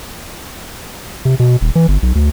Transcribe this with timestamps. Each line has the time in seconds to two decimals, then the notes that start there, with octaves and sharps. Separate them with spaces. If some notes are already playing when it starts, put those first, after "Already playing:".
1.25 C3
1.40 B2
1.61 D#1
1.75 E3
1.88 G1
2.02 B1
2.15 D2